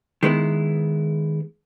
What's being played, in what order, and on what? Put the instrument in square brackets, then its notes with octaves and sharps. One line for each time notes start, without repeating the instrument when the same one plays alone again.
[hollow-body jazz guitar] D#3 G#3 B3 E4